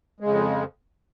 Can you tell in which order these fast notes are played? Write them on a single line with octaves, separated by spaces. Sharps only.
G#3 C#3 F2